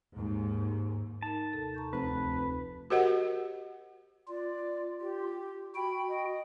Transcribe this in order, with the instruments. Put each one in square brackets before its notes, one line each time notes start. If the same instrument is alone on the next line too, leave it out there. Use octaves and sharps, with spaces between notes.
[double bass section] D#2 G#2
[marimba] D#4 A#4 [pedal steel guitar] A5
[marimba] D#2 C3 A4
A#5 C#6 G6
[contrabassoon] F1 [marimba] D2 C5 A5 [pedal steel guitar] B4
[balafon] F#4 G4 A#4 C5 D#5 F#5
[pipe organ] F4 [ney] D5
[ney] G4
[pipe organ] F#4 G5 [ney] B5
[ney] D#5